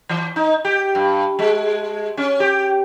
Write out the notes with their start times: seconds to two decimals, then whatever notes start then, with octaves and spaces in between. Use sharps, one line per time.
0.09 E3
0.36 D#4
0.65 G4
0.95 G2
1.39 G#3
2.17 C#4
2.40 G4